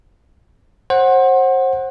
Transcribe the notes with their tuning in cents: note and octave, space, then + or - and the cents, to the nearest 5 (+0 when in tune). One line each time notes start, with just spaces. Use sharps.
C5 +30 F#5 +0